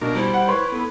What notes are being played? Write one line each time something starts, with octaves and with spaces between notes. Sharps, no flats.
B2 A#3 D4 A#4 D#5
G3 E4 C5
F#5
B4 C#5 C6
B3 A4